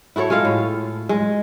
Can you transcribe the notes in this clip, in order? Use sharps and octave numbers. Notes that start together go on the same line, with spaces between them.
E4 F#4 A4 C#5
G#3 F4 A4 F5
A2
G#3